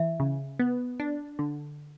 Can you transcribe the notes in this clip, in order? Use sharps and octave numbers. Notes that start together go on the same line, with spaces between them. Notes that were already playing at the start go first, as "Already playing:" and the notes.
Already playing: E3 E5
C#3
B3
D4
D3